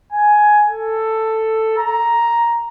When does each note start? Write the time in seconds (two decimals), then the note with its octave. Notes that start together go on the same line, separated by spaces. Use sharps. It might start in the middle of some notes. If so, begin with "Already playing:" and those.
0.12 G#5
0.68 A4
1.78 A#5